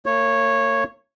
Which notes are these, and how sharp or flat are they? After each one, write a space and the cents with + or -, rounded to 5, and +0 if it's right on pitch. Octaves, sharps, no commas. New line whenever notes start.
A#3 -40 C#5 -10